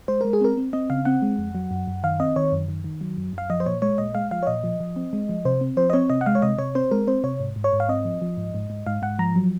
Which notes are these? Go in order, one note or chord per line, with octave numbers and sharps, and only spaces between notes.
G#3 C5
G#3 A#4
G#4
C4 A#4
C4
C4 D#5
C#3 F5
C4 F#5
G#3
F2
F#3
F#2
F#2
D#3 F5
C4 D#5
D#3 C#5
F#2
D#3
D#3
F#3
F#2
F#2 F5
F3 D#5
C5
A#2 C#5
G#3 C#5
A#2 D#5
G#3 F5
F3 F5
C#5
A#2 D#5
F3
F3
C4
G#3
F3
C3 C5
C4
F3 C5
D#5
C4 C#5
C3 D#5
F#5
G#3 F5
C#5
C3 D#5
C3 C#5
C4 C5
G#3 A#4
C4 C5
C3 C#5
G#2
G#2
C#5
G#2
F5
C4 D#5
F3
F3
G#2
G#2
G#2
G#2 F5
G#2 F#5
F3 A#5
F#3